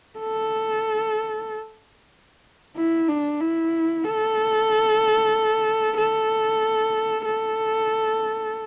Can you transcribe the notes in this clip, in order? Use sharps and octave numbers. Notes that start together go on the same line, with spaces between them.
A4
E4
D4
E4
A4
A4
A4